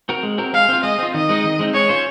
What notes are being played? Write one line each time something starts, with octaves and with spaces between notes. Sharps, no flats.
C4 F#4 A#4
G#3
C4 F#4 A#4
G#3 F5
C4 F4
G#3 D#5
C4 F4
D#3 D#5
G#3 C4 D#4
D#3
G#3 C4 D#4
G#3 C#5
C#4 F4 C5